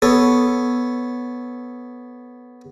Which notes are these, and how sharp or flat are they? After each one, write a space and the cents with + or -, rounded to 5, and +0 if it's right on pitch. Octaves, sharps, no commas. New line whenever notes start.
B3 +0 A4 +0 C#5 +0